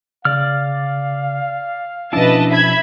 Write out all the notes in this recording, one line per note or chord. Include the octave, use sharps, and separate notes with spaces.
C#3 D5 F5 F6
B2 F3 C#4 D4 E4 B4 D#5 A5
E5 B5 G#6